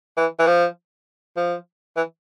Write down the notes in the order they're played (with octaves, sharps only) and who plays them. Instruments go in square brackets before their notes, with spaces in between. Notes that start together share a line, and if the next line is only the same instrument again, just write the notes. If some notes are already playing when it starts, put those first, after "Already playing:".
[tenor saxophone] E3
E3
F3
F3
E3